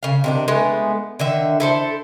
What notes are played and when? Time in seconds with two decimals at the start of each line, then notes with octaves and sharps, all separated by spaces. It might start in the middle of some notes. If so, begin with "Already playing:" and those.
0.03 C#3 F5
0.24 C3 D#3 D4
0.48 G#3 A3 B3
1.19 D3 D#3 E5
1.60 E4 A4 C5